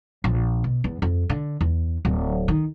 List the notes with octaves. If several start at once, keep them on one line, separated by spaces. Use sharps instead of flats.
A#1
B2
E2
F2
D3
E2
D1
D#3